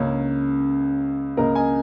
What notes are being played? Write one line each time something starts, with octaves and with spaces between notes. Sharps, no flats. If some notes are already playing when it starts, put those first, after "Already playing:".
Already playing: C#2 C#3 A#3 C#5
C#2 C#3 A#3 A#4 D#5
D#5 G#5